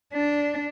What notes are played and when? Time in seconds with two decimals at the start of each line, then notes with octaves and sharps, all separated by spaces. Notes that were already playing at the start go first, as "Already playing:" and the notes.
0.14 D4